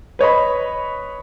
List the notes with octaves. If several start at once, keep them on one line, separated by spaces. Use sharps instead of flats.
B4 C#5 D#5 B5